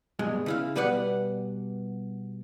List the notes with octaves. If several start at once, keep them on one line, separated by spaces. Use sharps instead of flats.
G2 B2 G#3
C#3 E4 F5
B2 G3 B3 B4 D5 F#5